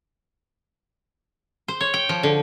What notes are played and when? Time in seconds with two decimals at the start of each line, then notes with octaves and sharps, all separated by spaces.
1.68 C5
1.81 C#5
1.94 G5
2.09 F3
2.23 D3